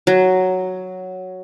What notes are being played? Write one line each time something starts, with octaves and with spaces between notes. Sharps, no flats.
F#3